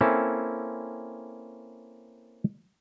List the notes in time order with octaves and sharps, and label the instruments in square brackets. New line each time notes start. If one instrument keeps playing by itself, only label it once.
[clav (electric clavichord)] A#3 C4 C#4 E4 A4